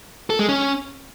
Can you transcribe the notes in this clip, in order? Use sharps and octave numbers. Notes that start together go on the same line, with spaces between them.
A4
G#3
C#4